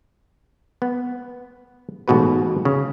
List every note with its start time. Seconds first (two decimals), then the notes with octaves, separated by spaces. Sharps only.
0.82 B3
2.08 A1 G#2 B2 F#4 B4
2.65 C#3